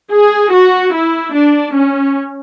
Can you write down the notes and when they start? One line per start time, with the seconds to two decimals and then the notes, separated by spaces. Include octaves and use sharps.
0.12 G#4
0.53 F#4
0.93 E4
1.34 D4
1.74 C#4